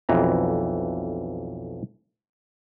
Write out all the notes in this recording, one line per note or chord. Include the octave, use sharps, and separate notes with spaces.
B1 F2 E3 A#5